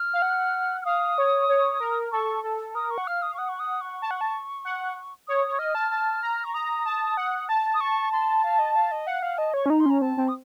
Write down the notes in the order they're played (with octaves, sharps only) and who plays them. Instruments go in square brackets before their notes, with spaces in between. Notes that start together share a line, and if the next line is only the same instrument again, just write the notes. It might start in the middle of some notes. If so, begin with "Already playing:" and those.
Already playing: [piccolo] F6
[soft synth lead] F5
F#5
[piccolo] F6
[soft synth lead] F5 [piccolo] D#6
[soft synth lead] C#5
C#5
A#4
[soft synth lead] A4 [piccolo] C#6
[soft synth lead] A4
[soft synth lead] A#4 [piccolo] D#6
[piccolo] C#6
[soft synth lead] F#5
[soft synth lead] F5 [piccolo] F6
[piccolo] D#6
C#6
[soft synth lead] F#5 [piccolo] D#6
[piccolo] C#6
D#6
C#6
[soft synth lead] A5
F#5
A5
F#5
[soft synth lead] C#5 [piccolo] D#6
[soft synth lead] C#5
[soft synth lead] D#5 [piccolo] F6
[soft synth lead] A5
A5
A#5
[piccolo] C#6
[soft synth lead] A#5 [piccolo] D#6
[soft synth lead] A5
F#5
A5
[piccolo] D#6
C#6
C6
F5
D#5
F5
D#5
[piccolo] F5 [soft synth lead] F#5
[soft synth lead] F5 [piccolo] F#5
[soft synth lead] D#5 [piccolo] A5
[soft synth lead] C#5 [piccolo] C#6
[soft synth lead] C#4
[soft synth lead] D#4 [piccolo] A#5
[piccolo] C6
[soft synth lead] C#4 [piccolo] A#5
[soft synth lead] C4 [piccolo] A5
[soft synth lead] C4
[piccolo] D#6